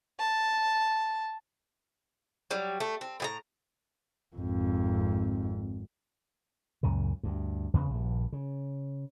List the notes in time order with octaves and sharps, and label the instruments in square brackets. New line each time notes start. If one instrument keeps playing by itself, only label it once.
[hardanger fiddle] A5
[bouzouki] F#3 G3
A3
C4
A2 G#4 A#5
[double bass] G#1 F2
[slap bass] C#2 F#2 A#2 C#3
D2 G2
E2 C#3 A#3 B3
A#1 G2
C#3